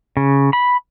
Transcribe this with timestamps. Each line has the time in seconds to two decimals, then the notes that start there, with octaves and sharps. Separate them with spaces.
0.17 C#3
0.53 B5